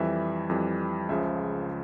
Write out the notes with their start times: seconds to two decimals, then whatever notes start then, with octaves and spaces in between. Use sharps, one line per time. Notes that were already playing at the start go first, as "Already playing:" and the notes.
Already playing: F2 E3 G3 E5
0.50 F2 E3 G3
1.09 C#2 C#3 F3 E5